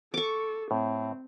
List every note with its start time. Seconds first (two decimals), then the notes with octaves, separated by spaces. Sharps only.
0.14 A4 C#6 D6
0.71 A2 C4